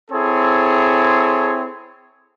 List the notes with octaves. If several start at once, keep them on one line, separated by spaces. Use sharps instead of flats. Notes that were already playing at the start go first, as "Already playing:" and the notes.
C4 E4 G#4 A4 C#5